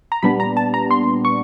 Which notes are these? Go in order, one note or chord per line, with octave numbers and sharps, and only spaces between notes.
A#5
A#2 G3 B3 D4 B5
A#5
A5
A#5
C6
C#6